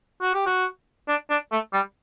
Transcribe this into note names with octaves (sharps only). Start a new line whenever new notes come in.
F#4
G4
F#4
D4
D4
A3
G3